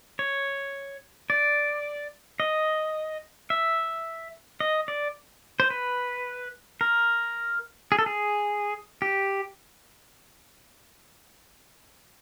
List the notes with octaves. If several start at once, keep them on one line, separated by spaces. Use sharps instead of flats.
C#5
D5
D#5
E5
D#5
D5
C5
B4
A#4
G#4
A4
G#4
G4